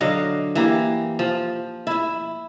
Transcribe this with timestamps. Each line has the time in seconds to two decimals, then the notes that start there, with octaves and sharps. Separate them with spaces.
0.01 D3 F#3 D#5 F5
0.55 E3 A#3 G4
1.19 F3
1.87 E4 E5